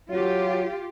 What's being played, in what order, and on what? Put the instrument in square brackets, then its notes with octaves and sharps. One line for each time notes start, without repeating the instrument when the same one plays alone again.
[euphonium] F#3 [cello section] F4 G4